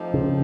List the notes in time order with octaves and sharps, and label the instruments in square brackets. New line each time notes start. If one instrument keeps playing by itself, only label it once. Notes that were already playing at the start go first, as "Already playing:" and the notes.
Already playing: [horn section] F3 A3 C4 D#4 G4
[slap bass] C#3